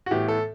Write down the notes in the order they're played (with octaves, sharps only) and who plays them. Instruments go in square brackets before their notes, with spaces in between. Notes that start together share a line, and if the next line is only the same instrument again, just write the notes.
[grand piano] F#4
A2 E3 B3 G4
A4